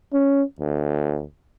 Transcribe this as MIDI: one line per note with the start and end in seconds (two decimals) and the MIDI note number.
0.13 0.43 61
0.60 1.25 38